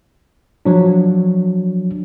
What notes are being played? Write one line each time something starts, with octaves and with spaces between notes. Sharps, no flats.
F3 F#3 D4